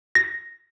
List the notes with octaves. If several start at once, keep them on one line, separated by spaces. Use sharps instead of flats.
A#6